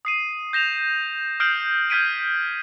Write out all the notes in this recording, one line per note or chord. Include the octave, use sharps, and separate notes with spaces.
D#6 C7 D#7
G6 A#6 E7 F7
D#6 F6 G6 C7 D7 F#7
F6 G6 G#6 B6 D7 D#7